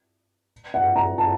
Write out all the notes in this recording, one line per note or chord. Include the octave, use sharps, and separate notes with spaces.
F#5
A#5
A5